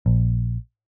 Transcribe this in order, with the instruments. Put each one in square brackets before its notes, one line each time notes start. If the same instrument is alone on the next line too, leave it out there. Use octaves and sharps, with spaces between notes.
[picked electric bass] A#1